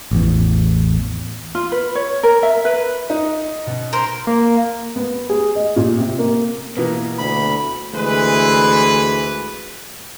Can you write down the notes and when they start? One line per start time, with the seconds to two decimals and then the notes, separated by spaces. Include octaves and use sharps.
0.11 A1 E2
1.55 F4
1.72 B4
1.95 C#5
2.23 A#4
2.43 E5
2.65 B4
3.10 D#4
3.66 B2 B3 C#4
3.93 A#4 C5
4.27 A#3
4.96 B3
5.29 G#4
5.55 D#5
5.76 A#2
5.98 C3
6.19 A#3
6.77 B2 E3 A#3 B3
7.19 D2 B5
7.94 D2 E3 G#3 B4